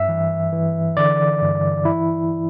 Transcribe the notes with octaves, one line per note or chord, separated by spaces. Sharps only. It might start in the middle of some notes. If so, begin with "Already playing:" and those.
Already playing: G2 E5
E3
E3
D3 D5
G2
E3 E4